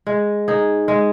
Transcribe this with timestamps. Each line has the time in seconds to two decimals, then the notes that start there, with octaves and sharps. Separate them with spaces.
0.07 G#3
0.48 D#4 G#4
0.88 G#3